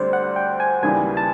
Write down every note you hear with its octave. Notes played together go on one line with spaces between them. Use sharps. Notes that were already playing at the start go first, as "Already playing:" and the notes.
Already playing: D2 D3 G3 C4 C5 D5
F#5
G5
G#5
D#2 C#3 E3 G3 G#5
A5